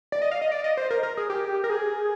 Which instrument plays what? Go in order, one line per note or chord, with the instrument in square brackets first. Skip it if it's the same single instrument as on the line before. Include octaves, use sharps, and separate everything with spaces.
[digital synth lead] D5
D#5
F5
D#5
D5
D#5
C5
A#4
A#4
G#4
G4
A#4
G#4